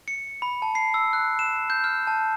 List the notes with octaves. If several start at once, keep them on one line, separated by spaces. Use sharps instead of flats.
C#7
B5
A5
C7
E6
F#6
E7
G6
F6
A5